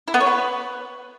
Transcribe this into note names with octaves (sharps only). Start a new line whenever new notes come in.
E4
B3
C#5
B4